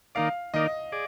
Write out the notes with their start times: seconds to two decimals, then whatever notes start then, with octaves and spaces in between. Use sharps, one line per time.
0.15 D#3 A#3 D#4 A#4 D5 F5
0.54 D#3 A#3 D#4 A#4 D5 D#5
0.92 G#4 D5